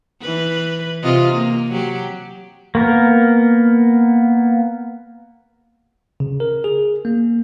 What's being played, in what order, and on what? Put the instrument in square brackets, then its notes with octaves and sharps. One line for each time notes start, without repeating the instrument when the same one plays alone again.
[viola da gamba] E3 B4
C3 F4 D#5
A#3
F#3 G4
[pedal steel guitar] A#3 B3 A#4
[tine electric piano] C#3
A#4
G#4
A#3